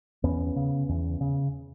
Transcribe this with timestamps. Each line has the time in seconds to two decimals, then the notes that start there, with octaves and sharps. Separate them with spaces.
0.24 E2 B3 C#4
0.56 C#3
0.89 E2
1.21 C#3